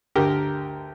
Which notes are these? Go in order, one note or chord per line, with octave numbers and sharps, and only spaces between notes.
D2 D3 G4 A#4